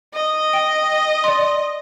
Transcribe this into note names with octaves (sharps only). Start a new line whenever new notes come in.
D#5
G5
D5 C6